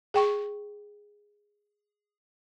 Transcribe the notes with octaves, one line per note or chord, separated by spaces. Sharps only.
G#4 G5 C#6